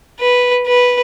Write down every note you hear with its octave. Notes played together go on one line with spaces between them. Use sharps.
B4
B4